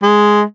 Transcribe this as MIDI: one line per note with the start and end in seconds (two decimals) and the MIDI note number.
0.03 0.42 56